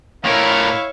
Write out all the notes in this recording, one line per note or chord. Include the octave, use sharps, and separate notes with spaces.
A2 E4 A#4 C#5 E5 F5